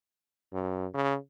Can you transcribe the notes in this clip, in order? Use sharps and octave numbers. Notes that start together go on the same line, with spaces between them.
F#2
C#3